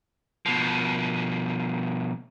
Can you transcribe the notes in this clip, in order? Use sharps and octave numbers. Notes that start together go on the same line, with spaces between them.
B2 F3